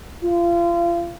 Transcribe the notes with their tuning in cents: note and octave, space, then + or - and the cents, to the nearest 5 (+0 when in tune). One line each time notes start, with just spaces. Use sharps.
F4 -30